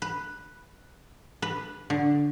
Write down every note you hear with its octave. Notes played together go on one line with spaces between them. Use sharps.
B4
B4
D3